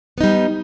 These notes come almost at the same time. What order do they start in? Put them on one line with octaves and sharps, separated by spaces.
B3 D#4 G3